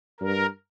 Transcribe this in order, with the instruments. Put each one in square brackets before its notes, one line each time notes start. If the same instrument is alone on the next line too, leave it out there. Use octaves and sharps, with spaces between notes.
[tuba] G2 [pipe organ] A#4